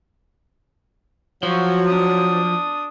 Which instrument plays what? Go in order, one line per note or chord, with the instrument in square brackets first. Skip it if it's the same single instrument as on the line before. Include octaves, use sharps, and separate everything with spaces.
[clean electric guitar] F3 [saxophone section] F#3 [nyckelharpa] F#4 C#5
[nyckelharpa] D4 D#6